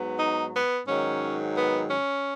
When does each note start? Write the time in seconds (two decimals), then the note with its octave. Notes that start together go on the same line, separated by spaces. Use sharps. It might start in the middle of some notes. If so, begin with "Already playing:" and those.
Already playing: G#2 F#3 B3
0.19 D#4
0.54 B3
0.87 G#2 D#3 F#3 C#4
1.55 B3
1.89 C#4